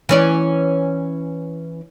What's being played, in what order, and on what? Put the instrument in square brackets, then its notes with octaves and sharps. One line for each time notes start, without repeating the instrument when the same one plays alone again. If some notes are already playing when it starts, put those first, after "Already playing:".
[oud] E3 C#4 D5